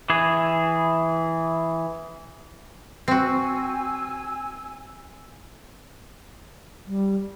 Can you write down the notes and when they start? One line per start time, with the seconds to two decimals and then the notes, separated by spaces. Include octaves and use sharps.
0.10 E3 G#4
3.08 C4 F#4 G#5 E6
6.87 G3